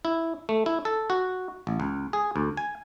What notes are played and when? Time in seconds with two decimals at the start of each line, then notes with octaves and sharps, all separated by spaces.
0.05 E4
0.49 A3
0.66 E4
0.85 A4
1.10 F#4
1.67 A1
1.80 C#2
2.13 G#4
2.36 D2
2.57 G#5